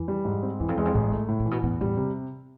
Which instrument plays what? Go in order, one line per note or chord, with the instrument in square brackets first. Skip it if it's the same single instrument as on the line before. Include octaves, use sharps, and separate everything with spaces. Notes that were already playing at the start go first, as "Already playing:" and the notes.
Already playing: [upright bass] F2 [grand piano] E3
[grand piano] G3
G#2
C4
[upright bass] E2 [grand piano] E3
[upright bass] F2
[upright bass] E2 [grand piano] G#3
[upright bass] F2
[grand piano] A1 [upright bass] G#2
[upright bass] A2 [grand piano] A3
[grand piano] A2
[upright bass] A#2
[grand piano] E3
[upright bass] B2
[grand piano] E2 [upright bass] A2
[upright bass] A2 [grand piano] G3
[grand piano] C3